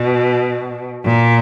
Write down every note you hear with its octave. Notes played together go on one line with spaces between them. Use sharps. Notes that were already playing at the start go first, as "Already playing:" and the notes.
Already playing: B2
A#2